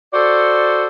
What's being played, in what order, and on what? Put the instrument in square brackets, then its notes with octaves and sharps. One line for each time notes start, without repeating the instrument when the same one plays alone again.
[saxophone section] F#4 A4 C5 D5